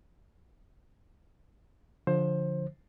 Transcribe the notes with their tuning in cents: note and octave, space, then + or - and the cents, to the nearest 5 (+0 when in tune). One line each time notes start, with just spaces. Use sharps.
D3 -15 F3 +0 C5 +20